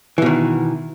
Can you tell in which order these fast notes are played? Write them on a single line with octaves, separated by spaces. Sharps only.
E3 B2 D#3